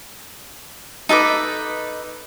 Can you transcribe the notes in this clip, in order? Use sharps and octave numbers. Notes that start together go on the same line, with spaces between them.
D#4 A4 B4 D6